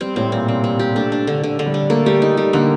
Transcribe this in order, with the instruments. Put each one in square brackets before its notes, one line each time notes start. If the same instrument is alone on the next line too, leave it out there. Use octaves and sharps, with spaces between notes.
[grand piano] G3 [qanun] C4
[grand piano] A2 [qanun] C4
[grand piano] A#2 [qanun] C4
[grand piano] C3 [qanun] C4
[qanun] C4
G4
[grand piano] A3 [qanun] D4
[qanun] D4
D3
D3
D3
[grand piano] G3
[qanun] D4
[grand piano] A3 [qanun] A#3
[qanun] G3 [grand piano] A3
[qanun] D#4
G3
[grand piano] D3 [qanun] A#3